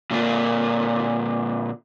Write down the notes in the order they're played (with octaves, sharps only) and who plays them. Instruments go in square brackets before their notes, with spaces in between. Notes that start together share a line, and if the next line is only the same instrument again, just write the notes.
[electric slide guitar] A#2 D3 A#3 D4 F4